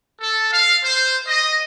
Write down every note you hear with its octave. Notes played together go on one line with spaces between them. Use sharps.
A4
F5
C5
D#5